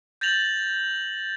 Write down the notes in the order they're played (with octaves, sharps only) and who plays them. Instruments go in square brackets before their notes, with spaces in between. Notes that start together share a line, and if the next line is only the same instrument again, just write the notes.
[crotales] G6 A6 A#6 F7 F#7